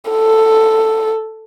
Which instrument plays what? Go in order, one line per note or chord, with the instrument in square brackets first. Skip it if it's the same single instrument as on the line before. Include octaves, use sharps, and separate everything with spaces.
[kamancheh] A4